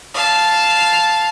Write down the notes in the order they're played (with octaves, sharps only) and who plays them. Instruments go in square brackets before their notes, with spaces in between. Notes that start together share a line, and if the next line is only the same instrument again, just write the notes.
[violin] F5 A5